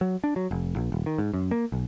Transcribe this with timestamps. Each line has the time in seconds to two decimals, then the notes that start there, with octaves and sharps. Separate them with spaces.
0.01 F#3
0.24 D4
0.36 F#3
0.51 F1
0.76 A#1
0.92 D#1
1.06 D#3
1.18 G#2
1.33 F#2
1.51 A#3
1.72 B1